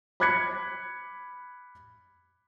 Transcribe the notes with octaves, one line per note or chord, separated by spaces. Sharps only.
B5 D6 F#6 G#6 B6 C#7